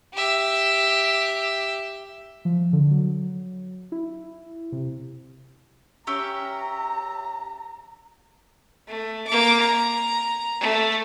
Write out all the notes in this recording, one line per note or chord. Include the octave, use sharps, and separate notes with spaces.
G4 E5
F3
D3
F#3
E4
C3
C#4 G4 E5 A#5
A3
A#3 D6
A#5
A3